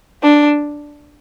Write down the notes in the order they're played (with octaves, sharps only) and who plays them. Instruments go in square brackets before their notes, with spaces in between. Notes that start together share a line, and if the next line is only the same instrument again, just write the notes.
[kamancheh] D4